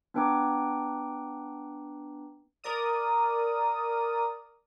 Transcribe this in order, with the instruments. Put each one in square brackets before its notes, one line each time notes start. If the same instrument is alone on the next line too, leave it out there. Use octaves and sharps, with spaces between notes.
[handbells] B3 D4 B4 G5 A#5 D6
[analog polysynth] A#4 D5 D#6